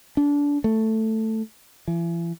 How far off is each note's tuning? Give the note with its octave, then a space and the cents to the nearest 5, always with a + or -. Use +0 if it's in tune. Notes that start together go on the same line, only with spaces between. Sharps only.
D4 -25
A3 +5
E3 +40